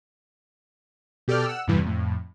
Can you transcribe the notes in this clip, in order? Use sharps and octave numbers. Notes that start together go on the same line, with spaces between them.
B2 G4 A4 D5 G5 F6
F#5 E6
E2 G2 C3 E3
F2 A2